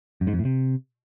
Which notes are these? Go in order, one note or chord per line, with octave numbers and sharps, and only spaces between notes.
F#2
G#2
F2
A2
C3